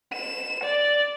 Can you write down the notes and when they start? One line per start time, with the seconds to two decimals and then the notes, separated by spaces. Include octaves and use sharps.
0.13 E7
0.64 D5